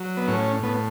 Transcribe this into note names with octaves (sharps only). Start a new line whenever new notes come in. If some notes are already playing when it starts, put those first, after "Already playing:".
Already playing: F#3
B3
A2 C#4
A2 B3